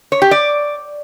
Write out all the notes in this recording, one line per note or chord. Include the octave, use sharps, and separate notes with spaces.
C#5
G4
D5